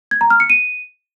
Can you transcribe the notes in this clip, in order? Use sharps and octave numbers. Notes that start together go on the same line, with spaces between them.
G#6
A#5
F6
C#7
D#7